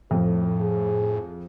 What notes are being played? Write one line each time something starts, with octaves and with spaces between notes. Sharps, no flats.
F2 A2 A4
G#4